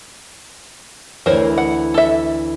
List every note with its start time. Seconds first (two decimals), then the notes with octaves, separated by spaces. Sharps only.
1.26 D2 E3 A#4 C5 C#5
1.58 F#5
1.94 A4 E5